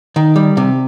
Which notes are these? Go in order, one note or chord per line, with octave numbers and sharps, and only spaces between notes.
D#3
G3
C3